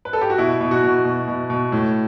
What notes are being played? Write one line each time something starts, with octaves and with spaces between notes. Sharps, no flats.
B4
A4
G4
F#4
B2 E4
B2
F#4
B2
B2
B2
B2
A2